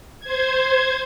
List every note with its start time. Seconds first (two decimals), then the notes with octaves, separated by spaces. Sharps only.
0.20 C5 G#6